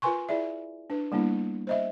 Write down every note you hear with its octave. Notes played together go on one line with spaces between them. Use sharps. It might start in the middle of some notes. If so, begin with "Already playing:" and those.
F4 A#4 B4 G#5 C6 C#6
E4 G#4 D5 E5
D4 B4
G3 A#3 B3 D4 E4
C5 D#5 E5